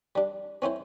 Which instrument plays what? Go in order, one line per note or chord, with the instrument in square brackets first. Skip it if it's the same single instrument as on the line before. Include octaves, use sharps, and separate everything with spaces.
[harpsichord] G3 D4
C4 C#4 E4 C5